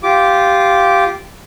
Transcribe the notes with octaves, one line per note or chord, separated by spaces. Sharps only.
F4 G4 D6